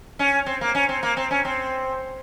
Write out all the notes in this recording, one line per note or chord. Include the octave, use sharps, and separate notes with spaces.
C#4
C4
A#3
C#4
C4
A#3
C4
C#4
C4